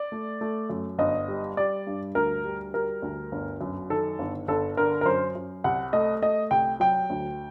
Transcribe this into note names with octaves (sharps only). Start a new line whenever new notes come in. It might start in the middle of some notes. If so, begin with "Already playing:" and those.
Already playing: D5
A3
A3
F#2
G1 D#5
G3
G3 D5
G2
D2 A#4
G3
G3 A#4
D2
G1
F#2
D#3 A4
G1
G1 A4
D3 A#4
A#4
F#2 C5
F#2
C2 F#5
A3 D#5
A3 D#5
C2 G5
F#3 G5
D2